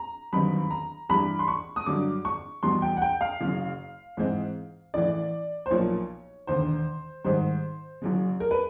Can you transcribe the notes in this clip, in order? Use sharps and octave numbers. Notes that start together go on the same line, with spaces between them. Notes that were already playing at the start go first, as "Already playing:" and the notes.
Already playing: A#5
G1 F#2 D#3 G3 C4 B5
A#5
G2 E3 G3 B5
C6
C#6
D#6
G2 D3 F#3 D6
C#6
E2 B2 G3 B3 C6
G5
F#5
G5
F5
F#1 F#2 C#3
G#2 E3 G#3 C4
A1 A2 E3 D5
C5
B1 A#2 F3 A#3 C#5
E1 D#2 D3 C5
G#2 D#3 G3 C5
F#1 F#2 C#3
A#4
B4